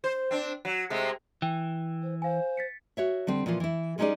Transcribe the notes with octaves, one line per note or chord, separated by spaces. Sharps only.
C5
C4 D4
F#3
C3 G#3 A3
E3 G5
C5
C5 F5 G#5
A6 B6 C#7
F#4 C#5 E5
D3 G3 C4
A#2 E3 F3 F4
E3 E4
G3 G#3 C#4 D#4 G#4 D5